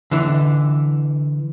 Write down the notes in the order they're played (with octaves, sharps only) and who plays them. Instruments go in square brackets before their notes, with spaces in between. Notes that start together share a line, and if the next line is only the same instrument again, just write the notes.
[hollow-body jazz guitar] D3 E3